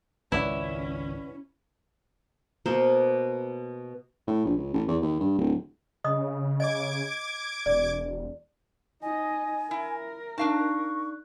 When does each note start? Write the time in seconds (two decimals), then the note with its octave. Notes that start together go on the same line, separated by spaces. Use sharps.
0.32 G#1 C#2 C#4 E4 B4 D5 F#5
2.66 B2 A#3 C5
4.28 A2
4.45 A#1
4.57 C#2
4.74 A1
4.88 E2
5.02 D#2
5.20 G2
5.38 D1
6.04 C#3 D#5 D#6
6.60 D#5 D6 G#6 D7
7.66 E1 D5
9.02 D#4 D#5 G#5
9.71 E4 A#4
10.38 D4 D#4 F5 A5 C#6 F#6